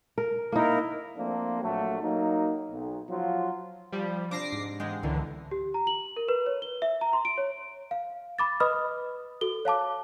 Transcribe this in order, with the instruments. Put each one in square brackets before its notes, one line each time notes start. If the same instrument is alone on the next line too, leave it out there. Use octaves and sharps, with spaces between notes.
[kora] A#4
[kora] A#3 D#4 [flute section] E4 A#4
[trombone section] F3 A3 A#3 C4 D4
A#1 F#3 A3
F#3 A#3 D#4
B1
F3 F#3 F4
[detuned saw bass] F3 [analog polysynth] G3
[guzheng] C3 D4 [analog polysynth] D6 A#6 C7
[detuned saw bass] G#2
[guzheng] E2 F5 G5 [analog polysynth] G#3
[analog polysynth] C#2 D3 [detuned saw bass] E3 [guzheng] A#4
[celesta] G4
A#5
F#7
A#4
B4
C#5
G7
E5
A#5
C6
D7
C#5
F5
B5 D6 A6
B4 D#5 B5 D#6 F6
F#4 A4 G7
C#5 F5 A5 D6